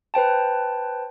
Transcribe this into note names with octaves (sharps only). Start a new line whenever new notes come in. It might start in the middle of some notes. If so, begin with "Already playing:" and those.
B4 C5 G5 A5